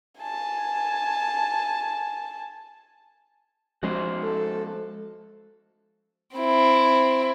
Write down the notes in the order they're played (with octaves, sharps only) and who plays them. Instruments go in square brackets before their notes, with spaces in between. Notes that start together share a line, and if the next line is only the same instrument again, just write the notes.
[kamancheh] G#5 A5
[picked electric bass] F3 G#3 C#4 [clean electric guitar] F#4 A#4 C5
[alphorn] A4
[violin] C4 E4